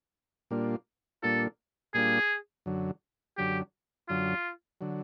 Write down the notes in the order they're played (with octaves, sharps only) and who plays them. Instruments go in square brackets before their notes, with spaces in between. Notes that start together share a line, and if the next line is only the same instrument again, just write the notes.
[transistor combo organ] A#2 G3 A#3 D4 F4
[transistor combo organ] A#2 G3 A#3 D4 F4 [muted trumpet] A4
[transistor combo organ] A#2 G3 A#3 D4 F4 [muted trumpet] G#4
[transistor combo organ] F#2 D3 F#3
[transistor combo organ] F#2 D3 F#3 [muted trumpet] G4
[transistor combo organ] F#2 D3 F#3 [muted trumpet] F4
[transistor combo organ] D3 F#3